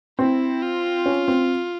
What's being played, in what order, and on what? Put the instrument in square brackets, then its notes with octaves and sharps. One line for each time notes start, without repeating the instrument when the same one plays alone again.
[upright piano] C4 [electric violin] E4
[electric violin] F4
[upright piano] C#4
C4